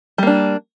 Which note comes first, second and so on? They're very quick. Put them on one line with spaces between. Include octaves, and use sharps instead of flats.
G3 A#3 D4